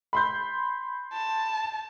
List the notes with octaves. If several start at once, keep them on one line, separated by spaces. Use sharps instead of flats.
B5 C6 G6
A5